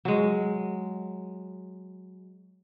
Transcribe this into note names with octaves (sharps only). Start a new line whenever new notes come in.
F#3 G#3